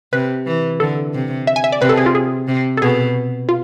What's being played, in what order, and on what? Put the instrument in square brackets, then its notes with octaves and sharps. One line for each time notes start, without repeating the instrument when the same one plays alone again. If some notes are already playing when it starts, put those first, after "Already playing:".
[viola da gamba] C3 [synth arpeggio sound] B4
[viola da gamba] E3
[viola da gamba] D3 [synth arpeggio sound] A4
[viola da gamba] C3
[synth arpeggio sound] E5
G#5
E5
D5
[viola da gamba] C3 [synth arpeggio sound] B4
[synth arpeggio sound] A4
G#4
F4
G#4
[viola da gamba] C3
[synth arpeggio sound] A4
[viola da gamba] B2 [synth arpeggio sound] G#4
[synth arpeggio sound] F4